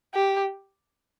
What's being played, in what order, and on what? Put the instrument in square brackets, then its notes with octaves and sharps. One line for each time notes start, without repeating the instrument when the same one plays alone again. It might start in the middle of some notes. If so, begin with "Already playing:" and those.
[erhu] G4